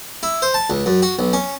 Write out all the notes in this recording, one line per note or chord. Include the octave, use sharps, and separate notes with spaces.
E4
C5
A5
C#2
F#2
F#4
B1
C#4